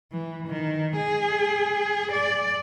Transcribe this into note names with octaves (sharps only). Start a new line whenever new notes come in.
E3
D#3
G#4
D5